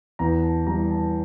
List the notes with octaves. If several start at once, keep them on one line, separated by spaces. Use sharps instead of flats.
E2 A#5
A5
E3 G3 A#5
A5